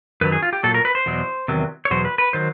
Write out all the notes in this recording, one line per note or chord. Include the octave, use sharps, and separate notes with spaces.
F#2 D#3 F#3 B4
G#4
F4
G4
A#2 F#3 A4
A#4
B4
C5
E2 B2 F#3
E2 C3 D#3 F#3
C#5
E2 B2 F#3 C5
B4
B4
D#3 F#3 C5